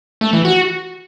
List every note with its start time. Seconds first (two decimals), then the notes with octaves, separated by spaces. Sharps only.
0.21 A3
0.33 E3
0.45 F#4